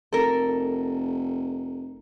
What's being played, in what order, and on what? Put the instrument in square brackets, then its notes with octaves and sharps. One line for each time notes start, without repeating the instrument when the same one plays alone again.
[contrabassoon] F1 [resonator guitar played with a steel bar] A4 A#4